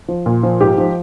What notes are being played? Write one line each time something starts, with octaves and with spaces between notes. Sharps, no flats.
F3
A#2
F3
G#2 G4
F3